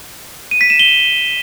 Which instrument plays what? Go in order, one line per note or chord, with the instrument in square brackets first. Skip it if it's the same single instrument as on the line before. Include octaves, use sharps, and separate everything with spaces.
[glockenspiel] D#7
B6
E7
G7